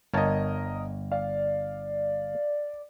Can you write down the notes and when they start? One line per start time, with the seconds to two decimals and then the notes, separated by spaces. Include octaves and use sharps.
0.14 G1 A#4 C#5 D#5 A5
1.12 D5 F5